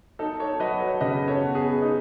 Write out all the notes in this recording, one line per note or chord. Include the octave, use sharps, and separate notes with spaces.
D#4 A4
A4 C#5
F#3 B4 D#5
A4 C#5
C#3 B4 D#5
A4 C#5
B3
G#4 B4
D#4 G#4